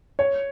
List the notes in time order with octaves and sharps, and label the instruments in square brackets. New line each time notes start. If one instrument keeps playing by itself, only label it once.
[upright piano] C#5